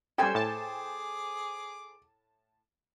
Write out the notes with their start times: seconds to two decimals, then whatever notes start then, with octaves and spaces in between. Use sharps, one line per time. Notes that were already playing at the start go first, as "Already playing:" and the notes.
0.18 C#3 G3 A4 C5 G5 G#5
0.35 A2 G#4 A5 D6